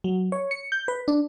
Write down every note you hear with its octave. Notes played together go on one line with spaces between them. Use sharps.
F#3
C#5
C#7
G6
B4
D4